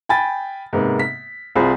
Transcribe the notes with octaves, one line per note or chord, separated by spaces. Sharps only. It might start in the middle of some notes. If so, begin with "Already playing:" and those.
G5 G#5 B5 A6
G#2 C3 A#3 B3
B6
C2 C4 F4 G#4 B5